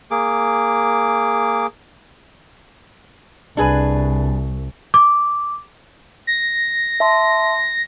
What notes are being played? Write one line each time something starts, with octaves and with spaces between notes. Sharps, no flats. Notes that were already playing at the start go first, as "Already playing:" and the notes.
A#3 G#4 D6
C2 D4 G#4 B4
D6
A#6
E5 A5 C6